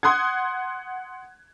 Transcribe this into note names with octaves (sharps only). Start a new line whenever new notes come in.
F#5 C6 D#6 F#6 G#6